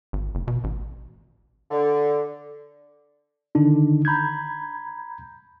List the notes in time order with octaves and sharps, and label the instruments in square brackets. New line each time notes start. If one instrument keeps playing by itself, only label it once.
[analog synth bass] G#1
F#1
B2
A1
[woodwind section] D3
[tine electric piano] D3 D#3 D4 D#4
A#5 B5 G6 G#6